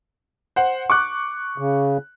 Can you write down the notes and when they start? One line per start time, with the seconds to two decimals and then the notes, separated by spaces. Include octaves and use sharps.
0.56 C5 F#5
0.90 C#6 D6 F#6
1.58 C#3